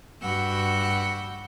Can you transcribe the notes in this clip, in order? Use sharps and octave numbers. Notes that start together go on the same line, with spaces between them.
G2 F#4 F#5 B5 E6 G6